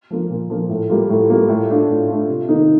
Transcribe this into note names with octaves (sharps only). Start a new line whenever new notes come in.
F3 A#3 F4
A#2
F3 A#3 F4
A2
G3 A#3 F4
A2
G3 A#3 F4
A2
A3 D4 F4
A2
A3 D4 F4
C3
D#3 A#3 D#4